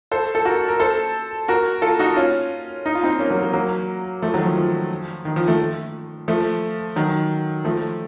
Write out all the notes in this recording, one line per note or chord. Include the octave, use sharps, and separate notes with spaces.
A4 C5
A4
F#4 A#4
A#4
A4 C5
F#4 A#4
F4 A4
D#4 F#4
C#4 F4
D#4
F4
C4 D#4
A#3 C#4
F#3 A#3
F#3 A#3
F#3 A#3
F3 A3
D#3 F#3
F3
F3
D#3
F3
F3 A3
F3 A3
D#3 F#3
F3 A3